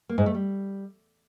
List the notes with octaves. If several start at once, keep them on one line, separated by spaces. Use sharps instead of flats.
A#3
G#2
A3
G3